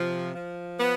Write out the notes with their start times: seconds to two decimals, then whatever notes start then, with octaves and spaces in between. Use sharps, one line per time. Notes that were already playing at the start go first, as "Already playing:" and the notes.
Already playing: C3 F3
0.35 F3
0.78 B3